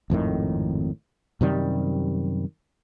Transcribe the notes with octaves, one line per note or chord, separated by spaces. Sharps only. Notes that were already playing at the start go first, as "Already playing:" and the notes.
G#1 F2 A2 D#3
F#2 C3 D#3 G3